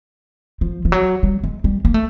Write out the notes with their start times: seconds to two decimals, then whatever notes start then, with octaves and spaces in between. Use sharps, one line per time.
0.61 F3
0.85 F3
0.92 F#3
1.23 G3
1.44 G#3
1.64 G3
1.85 A#3
1.94 A3